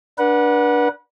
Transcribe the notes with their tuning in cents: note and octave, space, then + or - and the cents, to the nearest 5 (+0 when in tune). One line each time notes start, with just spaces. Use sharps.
D4 +0 B4 -35 F#5 -5